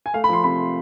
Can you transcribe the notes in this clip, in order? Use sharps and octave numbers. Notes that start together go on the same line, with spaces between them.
G#5
A3 F5
B5
F3 C6
C3 B5